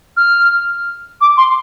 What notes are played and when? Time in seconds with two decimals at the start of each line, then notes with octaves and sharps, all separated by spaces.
0.17 F6
1.21 D6
1.37 C6